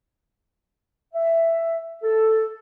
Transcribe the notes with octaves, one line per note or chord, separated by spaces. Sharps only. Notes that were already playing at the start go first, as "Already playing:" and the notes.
E5
A4